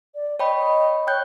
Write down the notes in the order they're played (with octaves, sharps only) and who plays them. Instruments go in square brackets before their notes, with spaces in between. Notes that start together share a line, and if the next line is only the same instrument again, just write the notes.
[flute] D5
[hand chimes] C#5 G5 B5 [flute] D#5
[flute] D#5
[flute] C#5 [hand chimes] G5 F#6 G6